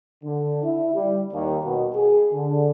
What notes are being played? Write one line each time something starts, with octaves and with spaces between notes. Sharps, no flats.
D3
E4
G3
D#2
B2
G#4
D3